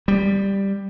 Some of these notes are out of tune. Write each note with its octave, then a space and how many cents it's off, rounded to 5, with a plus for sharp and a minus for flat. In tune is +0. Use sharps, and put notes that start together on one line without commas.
G3 +5